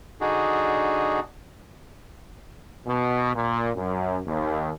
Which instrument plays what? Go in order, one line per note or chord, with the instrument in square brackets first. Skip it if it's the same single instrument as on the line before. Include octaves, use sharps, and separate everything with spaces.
[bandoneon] D3 D4 D#4 F#4 G#4
[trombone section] B2
A#2
F#2
D#2